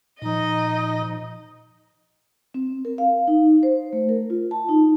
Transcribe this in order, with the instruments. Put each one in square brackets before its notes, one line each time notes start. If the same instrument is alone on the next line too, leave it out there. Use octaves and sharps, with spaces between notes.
[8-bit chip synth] A#2 F3 [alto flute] D#4 [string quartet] D#5
[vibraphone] C4
A#4
F5
D#4
C5
A3
A#4
F4
A5
D#4